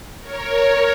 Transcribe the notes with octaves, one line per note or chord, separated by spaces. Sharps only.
A#4 C#5
A#4 C#5